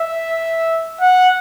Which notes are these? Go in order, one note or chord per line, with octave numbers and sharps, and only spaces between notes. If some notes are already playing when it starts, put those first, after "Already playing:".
Already playing: E5
F#5